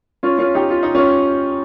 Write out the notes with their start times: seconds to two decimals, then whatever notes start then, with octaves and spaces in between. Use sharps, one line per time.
0.23 C#4 F4
0.39 C#4 F4
0.55 D#4 G4
0.70 F4
0.83 D#4
0.95 C#4 F4